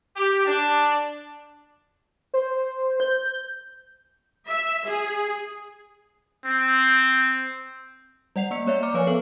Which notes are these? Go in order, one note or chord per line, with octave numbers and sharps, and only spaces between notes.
G4
D4
C5
G6
E5
G#4
C4
G3 D5 F#5 C7 F7
A#3 E6 C#7
A#3 C#5 D5 E5
A#5 D6 F6 C#7
F3 B4 C#5 F5 G#5 C#6
B3 A4 B4 F#7